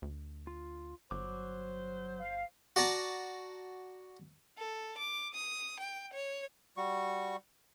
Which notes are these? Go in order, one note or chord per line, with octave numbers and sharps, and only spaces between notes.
D2
F4
G1 F#3 C5 D6
F5
F#4 D5 A5 A#5
A4
D6
D#6
G5
C#5
G3 F#4 C#6